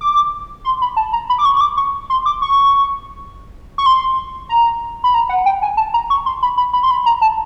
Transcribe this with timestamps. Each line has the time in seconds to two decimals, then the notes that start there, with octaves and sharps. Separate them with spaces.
0.01 D6
0.65 C6
0.82 B5
0.97 A5
1.13 A#5
1.30 B5
1.38 D6
1.45 C#6
1.57 C#6
1.61 D6
1.77 C#6
2.10 C6
2.26 D6
2.42 C#6
3.78 C#6
3.86 C6
4.49 A#5
5.04 B5
5.14 A#5
5.29 F#5
5.46 G5
5.62 G#5
5.77 A5
5.94 A#5
6.10 C#6
6.26 C6
6.43 B5
6.57 B5
6.73 B5
6.83 C6
6.91 B5
7.06 A#5
7.21 A5